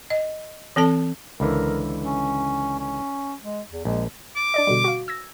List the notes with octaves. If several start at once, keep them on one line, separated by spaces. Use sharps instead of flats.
D#5
E3 C4 A4 A5
C#2 D3 E3 A#4
C#4
C#4
G#3
E2
A#1 G#3
D6
D4 D5 D#5
B2 D3 G3
F#4 F5
E6 G#6 A#6